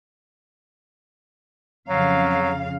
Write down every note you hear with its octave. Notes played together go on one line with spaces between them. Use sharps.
F2 C#3 F#3 F5